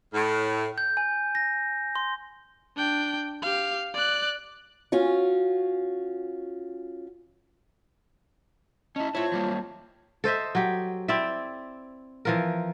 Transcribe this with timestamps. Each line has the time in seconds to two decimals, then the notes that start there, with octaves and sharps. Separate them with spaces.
0.13 A2
0.78 G6
0.97 G#5
1.35 A#6
1.96 C6
2.77 D4 G5
3.42 G4 F5
3.94 D5 F#6
4.92 C#4 F4 F#4
8.96 C#4 E4 D#5 A5
9.15 A3 C4 E4 F4 C#5
9.32 F#3 G3 A#3
10.24 A4 C5 D#5 E5
10.55 F#3 G4
11.08 C4 E4 D5 E5
12.25 E3 F3 A#4